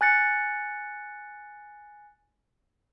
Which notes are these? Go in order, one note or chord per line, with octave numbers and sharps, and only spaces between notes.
G#5 F#6 A6 C#7